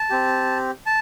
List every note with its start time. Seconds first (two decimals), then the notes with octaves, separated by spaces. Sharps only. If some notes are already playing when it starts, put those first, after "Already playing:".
Already playing: A5
0.10 C4 G4
0.86 A5